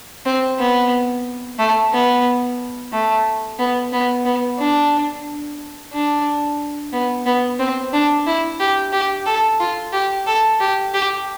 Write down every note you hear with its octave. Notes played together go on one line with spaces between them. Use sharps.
C4
B3
A3
B3
A3
B3
B3
B3
D4
D4
B3
B3
C4
D4
E4
G4
G4
A4
F4
G4
A4
G4
G4